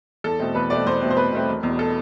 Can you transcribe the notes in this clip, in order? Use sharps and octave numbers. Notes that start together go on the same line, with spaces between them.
E2 A4
B2 A3 C4
E2 B4
B2 A3 C4 D5
E2 C5
B2 A3 C4
C5
E2 B4
B2 A3 C4
E1
E2 B2
A4